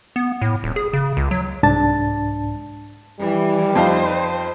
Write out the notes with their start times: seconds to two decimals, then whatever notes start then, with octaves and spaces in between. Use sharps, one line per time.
0.16 B3
0.42 A2
0.64 D#1
0.76 G#4
0.93 C#3
1.17 C#2
1.31 F#3
1.63 C2 G#2 D4 A5 A6
3.20 E3 G3
3.75 F2 D#4 C5 F5